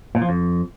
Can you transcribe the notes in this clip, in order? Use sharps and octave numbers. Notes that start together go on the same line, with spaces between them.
A#2
F3
F2